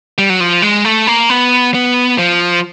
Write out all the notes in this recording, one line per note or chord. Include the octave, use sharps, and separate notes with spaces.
G3
F#3
F3
G#3
A3
A#3
B3
B3
F3